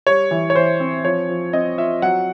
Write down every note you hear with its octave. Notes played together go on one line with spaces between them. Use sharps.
G3 C#5
E3
C#5
E3 C5
C4
F3 C#5
F3
C4 D#5
F4 E5
F#3 F#5